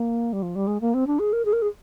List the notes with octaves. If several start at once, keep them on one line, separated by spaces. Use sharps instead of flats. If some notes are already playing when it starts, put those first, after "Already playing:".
Already playing: A#3
G3
F3
G3
G#3
A#3
C4
D4
G#4
A#4
G#4
A#4
G#4